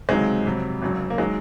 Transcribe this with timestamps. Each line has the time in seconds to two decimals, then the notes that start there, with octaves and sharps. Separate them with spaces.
0.09 C#2 C3 D#3 F#3 G#3
0.45 F2 C3 F#3
0.82 G#1 F#2 C#3 F#3
1.10 A#3
1.18 D#3 F#3 G#3